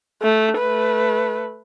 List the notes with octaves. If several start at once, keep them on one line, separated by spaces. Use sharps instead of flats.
A3
A3 B4